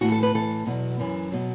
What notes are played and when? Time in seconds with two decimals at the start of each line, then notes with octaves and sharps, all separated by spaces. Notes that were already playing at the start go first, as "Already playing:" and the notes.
0.01 A2 E3 F#4
0.12 A4
0.23 B4
0.34 A2 E3 A4
0.67 E2 B2 F#3
1.00 F#2 E3
1.32 B2 F#3